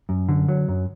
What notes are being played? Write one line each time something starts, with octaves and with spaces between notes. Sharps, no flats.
F#2
D3
F#3
F#2